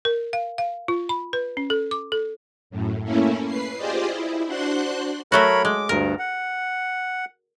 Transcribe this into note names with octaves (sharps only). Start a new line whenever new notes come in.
A#4
F5
F5
F4
B5
B4
C#4
A4
D6
A4
F#2 A2
A3 A#3 C#4 E4
B4 C7
F4 G4 G#4 C5 D5 D#5
E4
D4 F#4 C5 C6 F#6
F#3 A3 F#4 A#4 C#5 B5
G#3 D6
D2 G2 A#4
F#5